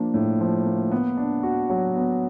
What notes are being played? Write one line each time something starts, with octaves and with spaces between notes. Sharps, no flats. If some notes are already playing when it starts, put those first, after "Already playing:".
Already playing: F3 A#3 D4
A2
F3
A#3
B3
D4
F#4
F#3
B3